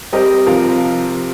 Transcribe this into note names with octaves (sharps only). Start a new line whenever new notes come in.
G3 C4 G4 A#4 D#5
C3 F3 C4 F4 A#4